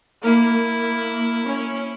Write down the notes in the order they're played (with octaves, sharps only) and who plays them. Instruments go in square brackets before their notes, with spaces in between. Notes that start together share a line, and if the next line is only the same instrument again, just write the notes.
[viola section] A#3 [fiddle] E4
[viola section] A#3
C#4